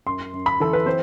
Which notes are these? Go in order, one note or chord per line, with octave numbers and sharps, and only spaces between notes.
F#2 C6
F#2
B5
E3 A4
B4
C4 C5